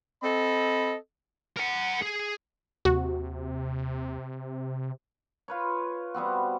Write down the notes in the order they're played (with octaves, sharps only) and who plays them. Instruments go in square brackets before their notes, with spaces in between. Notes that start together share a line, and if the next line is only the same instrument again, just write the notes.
[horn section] C4 A4 D#5 B5
[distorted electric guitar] A#4 F#5
G#4
[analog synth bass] D#2 [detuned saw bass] C3 [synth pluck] F#4
[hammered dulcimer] F4 B4 C#5
G3 B3 C4 F#4